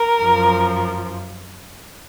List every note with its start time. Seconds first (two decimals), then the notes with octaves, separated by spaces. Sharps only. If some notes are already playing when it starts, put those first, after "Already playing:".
Already playing: A#4
0.22 F#2 F3